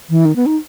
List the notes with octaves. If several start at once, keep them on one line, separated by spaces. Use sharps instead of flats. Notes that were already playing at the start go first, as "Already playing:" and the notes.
E3
D#3
B3
D#4